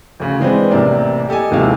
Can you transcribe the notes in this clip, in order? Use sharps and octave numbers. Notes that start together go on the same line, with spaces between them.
D2 C#3
E3 G#3 C4 D4 B4
A1 C3 A#3 D5
G4 A4 D#5 G#5
D#1 D#2 C3 G#3 E4 F5